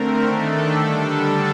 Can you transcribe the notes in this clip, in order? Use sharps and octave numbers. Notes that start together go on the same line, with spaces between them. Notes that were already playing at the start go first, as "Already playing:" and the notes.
Already playing: D3 A3 C4 A#4
D#3 A3 D4 A4
D3 G3 D4 A4